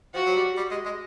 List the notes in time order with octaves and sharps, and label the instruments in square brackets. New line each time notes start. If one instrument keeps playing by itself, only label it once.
[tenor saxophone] F3 [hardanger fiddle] F#4
[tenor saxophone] F#3
G3
G3
G#3
G#3